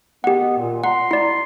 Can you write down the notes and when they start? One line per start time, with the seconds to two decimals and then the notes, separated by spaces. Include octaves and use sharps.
0.24 D#3 B3 G4 F#5
0.58 A#2
0.84 F#5 A#5 C6
1.11 E4 D5